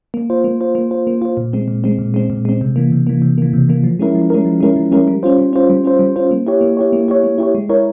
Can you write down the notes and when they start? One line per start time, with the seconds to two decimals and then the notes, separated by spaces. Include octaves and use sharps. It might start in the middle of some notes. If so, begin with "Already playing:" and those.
0.14 A#3
0.30 F4 C5
0.44 A#3
0.61 F4 C5
0.75 A#3
0.91 F4 C5
1.07 A#3
1.22 F4 C5
1.37 A#2
1.53 G#3 C4
1.68 A#2
1.84 G#3 C4
1.99 A#2
2.14 G#3 C4
2.30 A#2
2.45 G#3 C4
2.61 C3
2.76 E3 A#3
2.92 C3
3.07 E3 A#3
3.22 C3
3.38 E3 A#3
3.53 C3
3.68 E3 A#3
3.84 F3
3.99 G#3 C#4 E4 A#4
4.15 F3
4.30 G#3 C#4 E4 A#4
4.45 F3
4.61 G#3 C#4 E4 A#4
4.76 F3
4.91 G#3 C#4 E4 A#4
5.08 G3
5.23 C#4 F4 C5
5.38 G3
5.53 C#4 F4 C5
5.70 G3
5.84 C#4 F4 C5
5.99 G3
6.16 C#4 F4 C5
6.31 A#3
6.47 E4 G4 C#5
6.61 A#3
6.77 E4 G4 C#5
6.93 A#3
7.08 E4 G4 C#5
7.24 A#3
7.38 E4 G4 C#5
7.55 G#3
7.69 E4 A#4 C#5